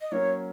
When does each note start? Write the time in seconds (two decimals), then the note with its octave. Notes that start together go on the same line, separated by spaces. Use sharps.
0.01 D#5
0.12 F#3 A#3 C#4 A#4 C#5